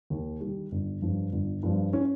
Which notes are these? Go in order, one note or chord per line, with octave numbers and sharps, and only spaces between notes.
D#2
D#3 G3
G1
G2 F3
G1
G2 F3
C#4